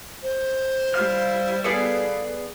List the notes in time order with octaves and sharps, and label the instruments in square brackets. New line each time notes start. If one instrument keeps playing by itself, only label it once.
[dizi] C5
[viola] G3 E4 [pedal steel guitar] F5 F6
[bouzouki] B3 G#4 D5 [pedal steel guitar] A4 [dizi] F5